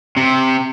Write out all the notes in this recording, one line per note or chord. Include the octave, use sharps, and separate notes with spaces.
C3